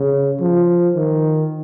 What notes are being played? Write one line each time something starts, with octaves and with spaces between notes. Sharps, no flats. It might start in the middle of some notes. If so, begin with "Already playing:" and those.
Already playing: C#3
F3
D#3